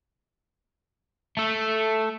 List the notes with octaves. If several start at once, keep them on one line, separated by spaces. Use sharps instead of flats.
A3 A4